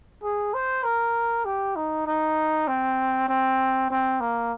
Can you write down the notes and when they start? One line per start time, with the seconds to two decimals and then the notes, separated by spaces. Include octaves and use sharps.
0.23 G#4
0.54 C5
0.84 A#4
1.45 G4
1.76 D#4
2.07 D#4
2.68 C4
3.29 C4
3.91 C4
4.20 A#3